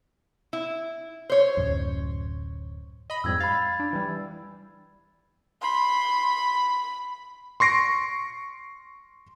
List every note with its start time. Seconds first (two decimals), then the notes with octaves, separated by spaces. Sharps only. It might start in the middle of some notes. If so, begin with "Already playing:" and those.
0.53 E4
1.30 C5 C#5
1.57 D1 F#2
3.10 D#5 B5
3.24 F2 G#2 G3 E6 G#6
3.40 F5 B5 A6
3.80 D4
3.93 E3 G3
5.62 B5 C6
7.60 C6 C#6 A#6 C7 D7